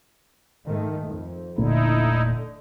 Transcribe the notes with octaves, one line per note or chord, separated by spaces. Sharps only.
G#2 D#3 A3
F2
E1 A#2 D3 A3 D#4 E4